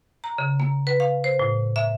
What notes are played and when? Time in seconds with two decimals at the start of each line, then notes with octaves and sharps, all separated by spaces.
0.24 A#5
0.38 C#3
0.60 A#3
0.87 B4
1.00 F5
1.24 C5
1.39 A2
1.76 E5